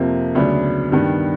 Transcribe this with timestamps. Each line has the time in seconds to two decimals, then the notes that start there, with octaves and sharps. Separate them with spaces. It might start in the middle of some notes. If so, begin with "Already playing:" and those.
Already playing: F2 C3 F3 A#3
0.35 D2 C#3 F#3 B3 D4
0.92 G2 D#3 G3 B3